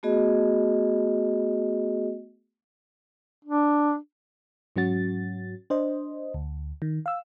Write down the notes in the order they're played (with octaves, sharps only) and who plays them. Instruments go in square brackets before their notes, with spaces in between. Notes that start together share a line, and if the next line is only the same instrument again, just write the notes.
[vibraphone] A3 B3 F#4 G#4 D#5
[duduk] D4
[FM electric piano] G#2 F#3 C#4 F#4 A6
D4 C5 D#5
D2
D#3
F5 E6